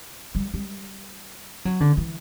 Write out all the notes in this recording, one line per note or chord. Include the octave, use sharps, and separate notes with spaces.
G3
G3
F#3
D3
E3